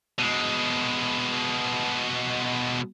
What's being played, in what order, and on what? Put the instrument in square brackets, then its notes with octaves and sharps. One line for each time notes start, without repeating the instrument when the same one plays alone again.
[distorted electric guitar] B2 G#3